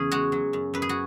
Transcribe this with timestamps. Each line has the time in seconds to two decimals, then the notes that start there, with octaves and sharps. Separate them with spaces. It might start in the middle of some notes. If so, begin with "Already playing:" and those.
Already playing: E2 C#3 C#4 G#4
0.12 G#3 F#4
0.32 F#3
0.53 F#2
0.74 F#2 B4
0.82 G#4
0.89 F#4